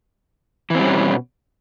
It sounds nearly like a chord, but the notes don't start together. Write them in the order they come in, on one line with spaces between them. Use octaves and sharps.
E3 C4 G3 C#4 B2